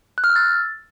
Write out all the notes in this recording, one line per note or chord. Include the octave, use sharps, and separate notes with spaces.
F#6
F6
E6
A6